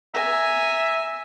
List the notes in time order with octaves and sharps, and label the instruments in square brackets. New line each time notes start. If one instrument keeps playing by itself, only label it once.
[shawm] E5 [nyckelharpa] G#5 [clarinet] A#5